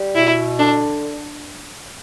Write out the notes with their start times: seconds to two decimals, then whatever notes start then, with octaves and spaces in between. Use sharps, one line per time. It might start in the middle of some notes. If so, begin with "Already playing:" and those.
Already playing: G3
0.15 B2 E4
0.59 D3 D4